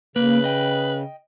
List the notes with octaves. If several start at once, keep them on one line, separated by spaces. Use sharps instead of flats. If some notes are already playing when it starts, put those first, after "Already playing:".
C#3 A#3 B4
D#5 G5